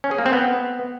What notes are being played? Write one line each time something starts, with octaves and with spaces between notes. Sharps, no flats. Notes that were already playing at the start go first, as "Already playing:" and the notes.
C#4
G#4
A#3
C4
B3